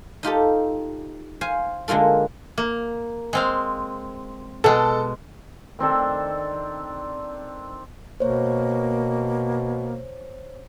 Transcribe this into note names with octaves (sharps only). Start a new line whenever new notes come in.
D#4 F4 G4 A4
C5 F5 G#5
D3 G#3 A#3 F4 A4
A#3
G#3 C4 F5
B2 G#3 A4
D#3 C4 D4 A4
B2 A#3 C5 C#5